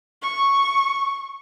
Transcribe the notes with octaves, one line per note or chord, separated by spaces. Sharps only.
C#6